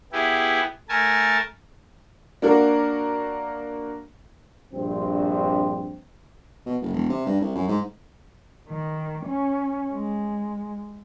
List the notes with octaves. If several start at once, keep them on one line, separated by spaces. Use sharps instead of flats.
B3 E4 G4 G#4
A3 A#4 G#5 A5
A#3 D4 F#4 A#4
A#1 G2 C4
B2
F#1
E1
C3
G2
C2
F#2
G#2
D#3
C#4
G#3